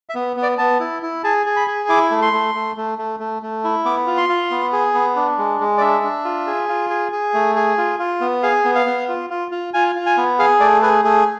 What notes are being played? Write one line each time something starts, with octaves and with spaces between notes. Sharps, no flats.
E5
B3
B3
D5
B3 A5
E4
E4
G#4 A5
G#4
B5
G#4
E4 D6
A3
C6
A3
A3
A3
A3
A3
A3
E4
B3 D6
F4
C6
F4
B3
G#4
B3
D4
G#3
G#3
D5
D4 E5
D4
F4
G#4
F4
G#4
G#4
A3
G#4
F4
F4
B3
G#4 F5
B3
F5
B3
F4
F4
F4
F4 G#5
F4
G#5
B3
G#4 F5
A3 D5
G#4 B4
A3 G#4